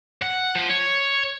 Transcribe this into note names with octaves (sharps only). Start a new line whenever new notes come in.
F#5
F3
C#5